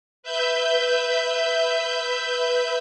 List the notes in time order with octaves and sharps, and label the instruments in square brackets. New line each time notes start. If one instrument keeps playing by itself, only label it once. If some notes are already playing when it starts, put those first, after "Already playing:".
[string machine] B4 E5 G6